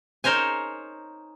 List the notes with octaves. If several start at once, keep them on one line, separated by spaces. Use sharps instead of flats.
D#4 A#4 C5 C#5 G#5